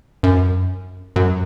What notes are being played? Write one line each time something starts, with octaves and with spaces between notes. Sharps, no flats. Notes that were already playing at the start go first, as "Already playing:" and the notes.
F#2
F#2